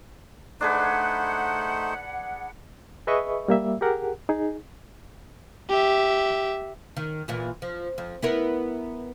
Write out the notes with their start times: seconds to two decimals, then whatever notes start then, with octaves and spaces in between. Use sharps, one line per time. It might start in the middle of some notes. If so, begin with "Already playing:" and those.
0.61 A3 D4 D#4 G#4 B4 C5 F#5
3.07 G#4 B4 D#5 E5 B5 C#6
3.48 G3 A#3 E5
3.81 G4 G#4 A#4 F#5
4.29 D#4 G#4
5.69 G4 E5
6.97 D#3
7.28 E2 A#2 E3
7.62 F3
7.98 F2
8.22 B3 E4 A#4